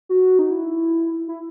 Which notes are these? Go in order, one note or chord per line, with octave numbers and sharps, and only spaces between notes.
F#4
D#4
E4
E4